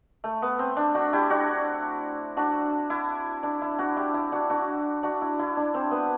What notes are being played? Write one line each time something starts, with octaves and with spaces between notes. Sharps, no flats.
A3
B3
C4
D4
D4 F#4
E4 G4
D4 F#4
D4 F#4
E4
D4
E4
D4 F#4
E4 G4
E4
D4 F#4
D4 F#4
D4 F#4
E4
E4
D4
C4
B3